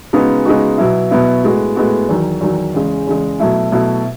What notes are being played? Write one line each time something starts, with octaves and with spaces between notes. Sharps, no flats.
C#3 G#3 B3 D#4 F#4
C#3 G#3 B3 D#4 F#4
B2 F#3 B3 E4
B2 F#3 B3 E4
A2 G#3 B3 F#4
A2 G#3 B3 F#4
E2 D#3 F#3
E2 D#3 F#3
E2 C#3 G#3
E2 C#3 G#3
B2 F#3 A3 E4
B2 F#3 A3 E4